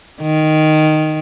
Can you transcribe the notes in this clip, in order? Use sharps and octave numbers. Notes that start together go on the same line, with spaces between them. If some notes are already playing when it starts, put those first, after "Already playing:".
D#3